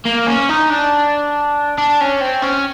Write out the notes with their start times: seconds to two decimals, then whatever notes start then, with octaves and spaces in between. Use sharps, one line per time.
0.05 A#3
0.27 C#4
0.49 D#4
0.70 D4
1.78 D4
2.01 C#4
2.21 C4
2.43 C#4